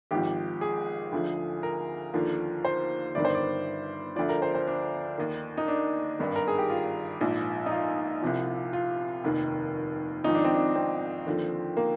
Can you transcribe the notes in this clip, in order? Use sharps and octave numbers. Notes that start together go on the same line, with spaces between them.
G#1 G#2 F3 G4
G#4
D2 D3 F3
A#4
D#2 D3 F3
C5
G1 G2 D#3 D5
C5
D5
D2 D3 F3 D5
A#4
C5
C5
D4
D#2 D#3
D#4
D4
G#1 G2 D#3
A#4
G#4
G4
F4
A#1 G#2 F3
D#4
F4
C2 C3 F3
F4
F1 D#2 D#3
G#1 G#2 F3 D#4
D4
C4
D4
C4
D#2 D3 F3
A#3